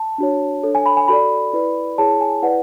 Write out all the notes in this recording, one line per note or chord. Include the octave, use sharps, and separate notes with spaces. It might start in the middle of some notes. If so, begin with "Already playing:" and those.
Already playing: A5
D4 F#4 C#5
D4 A4 C#5
G#5
B5
G#5
F#4 A4 D5 B5
E4 B4 D5
E4 G#4 C#5 A5
G#5
E4 B4 D5 F#5